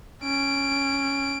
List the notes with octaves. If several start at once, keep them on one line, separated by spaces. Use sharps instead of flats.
C#4 D7